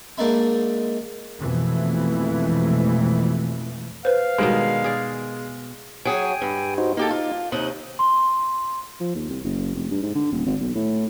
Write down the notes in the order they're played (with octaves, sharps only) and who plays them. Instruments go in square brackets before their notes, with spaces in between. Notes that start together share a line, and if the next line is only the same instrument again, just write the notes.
[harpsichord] G#2 A#3 D4 D#4 E5 B5
[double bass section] F2 B2 E3 G#3 A3
[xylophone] B4 C5 [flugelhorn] F5
[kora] B2 D#3 G3 [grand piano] G#3
[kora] G#4 D5
[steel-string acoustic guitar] F#3 G#4 [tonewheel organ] G5 G#5
[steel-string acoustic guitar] G2
[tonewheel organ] D#4 F#4 C5
[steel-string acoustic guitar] A#3 G4 A4 [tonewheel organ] D#4
[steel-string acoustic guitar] F4
[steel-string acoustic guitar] D#2 C3 D#4 [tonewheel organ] F#6
[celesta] C6
[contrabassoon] F3
D#2
C2
F#1
F1
G2
G#2
D3
D#1
G#1
B1
A2